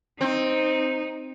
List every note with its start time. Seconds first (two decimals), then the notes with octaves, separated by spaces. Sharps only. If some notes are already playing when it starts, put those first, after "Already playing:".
0.21 C4 D#4